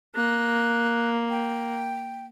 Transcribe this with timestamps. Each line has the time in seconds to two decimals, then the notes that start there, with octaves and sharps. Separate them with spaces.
0.15 A#3 F#6
1.30 G5